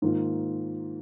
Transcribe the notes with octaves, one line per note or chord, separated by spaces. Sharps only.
G#2 D#3 A#3 F4